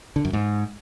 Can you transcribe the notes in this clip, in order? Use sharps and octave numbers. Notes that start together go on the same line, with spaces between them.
D3
F#2
G#2